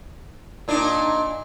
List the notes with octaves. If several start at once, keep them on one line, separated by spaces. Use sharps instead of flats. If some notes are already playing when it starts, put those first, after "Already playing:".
A#2 D4 D#4